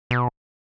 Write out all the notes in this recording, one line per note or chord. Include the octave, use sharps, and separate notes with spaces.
B2